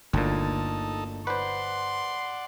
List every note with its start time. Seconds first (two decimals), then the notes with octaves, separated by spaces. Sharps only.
0.13 G1 D2 A#2 D#4 A4
1.27 B4 C5 D5 F#5 C6